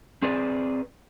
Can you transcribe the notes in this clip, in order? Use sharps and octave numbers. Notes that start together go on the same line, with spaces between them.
C4 G#4 B4 D5